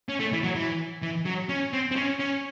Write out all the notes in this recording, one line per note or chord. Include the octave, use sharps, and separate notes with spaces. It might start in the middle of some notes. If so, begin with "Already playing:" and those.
C#4
A3
E3
F#3
E3
E3
F#3
C#4
C4
C4
C#4
C#4